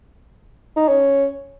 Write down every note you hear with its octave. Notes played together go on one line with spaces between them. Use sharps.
D#4
C#4